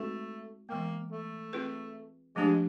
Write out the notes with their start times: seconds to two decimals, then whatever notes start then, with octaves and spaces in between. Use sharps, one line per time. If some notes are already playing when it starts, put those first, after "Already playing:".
Already playing: G#3 A3 C4 D#4 F#4 B4
0.69 E3 G#3 A#3 B3
1.11 A3
1.53 C4 F4 G#4 B4
2.36 F3 G#3 A3 D4 G4